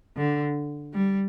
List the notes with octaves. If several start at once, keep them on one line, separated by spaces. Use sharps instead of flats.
D3
G3